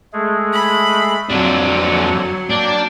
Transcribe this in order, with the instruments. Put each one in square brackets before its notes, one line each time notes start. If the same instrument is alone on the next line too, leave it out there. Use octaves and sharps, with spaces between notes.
[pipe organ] G#3 A3 G#4
[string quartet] B5
[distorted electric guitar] F2 D4 [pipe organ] D3 C4 [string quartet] F#3
[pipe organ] A#3 D5 G5 [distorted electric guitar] D4